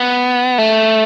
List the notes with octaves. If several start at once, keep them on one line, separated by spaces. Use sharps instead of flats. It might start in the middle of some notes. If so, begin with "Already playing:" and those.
Already playing: B3
A3